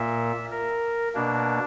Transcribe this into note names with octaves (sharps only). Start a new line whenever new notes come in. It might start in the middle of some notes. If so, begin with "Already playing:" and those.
Already playing: A#2 A#3 E5
A#4
B2 A#3 D4